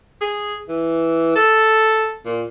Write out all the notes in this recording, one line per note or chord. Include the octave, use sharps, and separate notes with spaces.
G#4
E3
A4
A#2